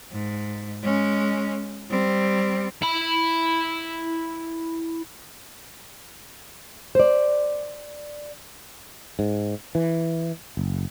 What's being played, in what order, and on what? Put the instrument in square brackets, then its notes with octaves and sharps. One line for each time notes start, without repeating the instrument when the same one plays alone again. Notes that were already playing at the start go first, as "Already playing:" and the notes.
[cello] G#2
G#3 C#4
G3 C4
[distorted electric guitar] E4 B5
[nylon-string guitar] C5 D5
[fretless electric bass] G#2
E3
F#1